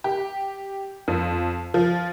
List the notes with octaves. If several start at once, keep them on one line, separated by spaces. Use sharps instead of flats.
G4
F2
F3